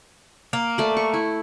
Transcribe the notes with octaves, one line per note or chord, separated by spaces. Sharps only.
A#3
A3 D5
C#6
E4